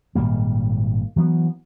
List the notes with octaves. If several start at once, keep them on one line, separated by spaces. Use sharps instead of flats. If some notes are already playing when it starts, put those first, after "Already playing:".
G#1 A#2 G3 A#3
E3 F#3 A3 B3